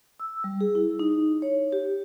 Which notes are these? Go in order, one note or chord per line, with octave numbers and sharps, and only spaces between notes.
E6
G3
G#4
E4
D#4
C#5
G4